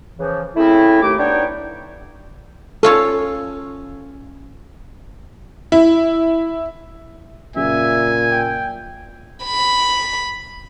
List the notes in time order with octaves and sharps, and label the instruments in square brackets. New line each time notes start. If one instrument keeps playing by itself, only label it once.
[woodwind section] C#3 E3 F3
C#3 A3 C4 E4
D#2 A3 D6
B3 D4 D#4 C#5 G5
[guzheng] C#4 F4 C#5 [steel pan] A4
[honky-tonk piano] E4
[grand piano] F#2 C#3 [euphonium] A#2 [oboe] E5 [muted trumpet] G#5
[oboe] G5
[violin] B5